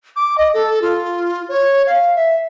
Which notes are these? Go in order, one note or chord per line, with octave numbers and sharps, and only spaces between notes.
D6
D#5
A4
F4
C#5
F5
E5